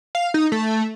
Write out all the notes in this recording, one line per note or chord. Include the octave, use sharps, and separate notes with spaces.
F5
D#4
A3